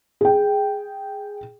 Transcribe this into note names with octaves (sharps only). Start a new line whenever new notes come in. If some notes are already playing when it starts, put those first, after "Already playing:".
G#4 G5